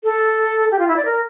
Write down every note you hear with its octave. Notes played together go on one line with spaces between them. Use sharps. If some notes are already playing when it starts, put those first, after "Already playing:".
A4
G4
F4
E4
D5
A#4